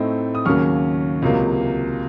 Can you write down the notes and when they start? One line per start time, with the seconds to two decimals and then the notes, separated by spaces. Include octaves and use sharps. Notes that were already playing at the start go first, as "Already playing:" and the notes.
Already playing: A2 A3 C4 D#4
0.35 D#6
0.45 D#2 C#3 F#3 A#3 C#4 C#6 F6
1.22 C#2 C3 F#3 A#3